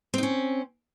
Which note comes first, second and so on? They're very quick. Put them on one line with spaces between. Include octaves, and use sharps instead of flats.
C4 D#4 C#4